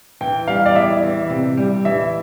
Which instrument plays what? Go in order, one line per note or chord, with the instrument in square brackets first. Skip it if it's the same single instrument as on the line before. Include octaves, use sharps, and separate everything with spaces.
[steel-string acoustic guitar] E3 [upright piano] G5
[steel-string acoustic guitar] G3 [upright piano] F5
[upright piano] D5
[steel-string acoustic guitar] E2 [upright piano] E5
[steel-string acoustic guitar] E3
C3
G3
[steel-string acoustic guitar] E3 [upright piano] E5